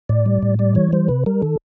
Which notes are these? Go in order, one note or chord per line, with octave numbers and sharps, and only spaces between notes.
A2 D5
G3
A2
G3 D5
E3 C#5
G3 C5
C3 B4
G3 A#4
D#3 A4